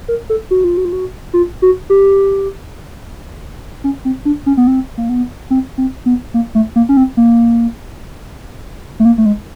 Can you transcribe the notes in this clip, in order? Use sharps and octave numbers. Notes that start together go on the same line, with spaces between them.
A#4
A4
F#4
F4
F#4
F4
F#4
F4
F#4
G4
C#4
C4
D4
C#4
B3
C4
A#3
B3
C4
C4
B3
A#3
A3
A#3
C#4
C4
A#3
A3
A#3
A3
G#3